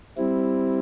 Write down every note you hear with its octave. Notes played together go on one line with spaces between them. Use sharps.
G3 C4 E4